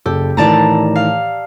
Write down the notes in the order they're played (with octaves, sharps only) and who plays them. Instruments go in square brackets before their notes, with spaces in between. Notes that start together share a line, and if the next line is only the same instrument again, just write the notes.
[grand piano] F#1 A4 E6 [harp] G4
[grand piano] A2 D#3 E3 [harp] D5 A5 A#5
[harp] F5